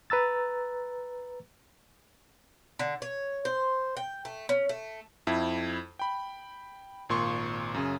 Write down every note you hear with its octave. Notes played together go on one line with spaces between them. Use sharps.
B4 A#5 E6 A6
D3
C#5
C5
G5
A3
C#4
A3
F2 E4
G5 B5
G#1 A#2 C6 C#6
F#2 C#3